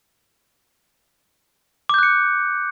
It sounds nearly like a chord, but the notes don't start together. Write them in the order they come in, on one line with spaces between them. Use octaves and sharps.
D6 G6 F#6 C#7